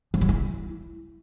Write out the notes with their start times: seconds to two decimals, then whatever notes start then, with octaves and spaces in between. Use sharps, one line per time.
0.14 F3
0.21 F#3
0.29 E4